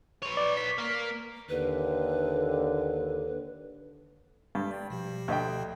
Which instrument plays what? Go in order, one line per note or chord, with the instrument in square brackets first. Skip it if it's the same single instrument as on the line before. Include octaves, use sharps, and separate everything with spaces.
[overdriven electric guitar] B4 C#5
[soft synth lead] D5
B6
[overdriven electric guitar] A#3
[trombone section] D#2 D3 [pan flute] B4
[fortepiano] G2 [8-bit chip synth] G#3
[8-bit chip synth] D5 G5
B2 F3 G4
[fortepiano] D2 D#5 G5